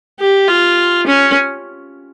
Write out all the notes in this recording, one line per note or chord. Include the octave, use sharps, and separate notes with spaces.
G4
F4
C#4